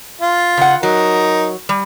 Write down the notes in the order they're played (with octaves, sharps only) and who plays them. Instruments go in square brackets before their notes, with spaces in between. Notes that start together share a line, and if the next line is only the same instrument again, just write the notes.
[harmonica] F4
[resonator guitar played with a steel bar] C#3 F#5
[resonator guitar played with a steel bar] F#3 [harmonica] D#4 A#4
[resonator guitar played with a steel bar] G3